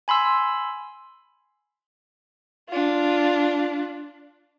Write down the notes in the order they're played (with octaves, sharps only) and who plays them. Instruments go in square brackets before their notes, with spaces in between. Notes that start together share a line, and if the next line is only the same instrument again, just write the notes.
[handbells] G#5 B5 C6 E6
[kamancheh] D4 F4